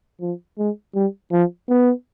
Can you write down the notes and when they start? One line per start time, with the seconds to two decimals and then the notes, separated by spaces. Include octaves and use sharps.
0.21 F3
0.58 G#3
0.95 G3
1.32 F3
1.69 B3